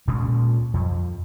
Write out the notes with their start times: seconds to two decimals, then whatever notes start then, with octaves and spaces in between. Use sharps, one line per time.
0.08 D2 A#2 G#3 C#4
0.74 F2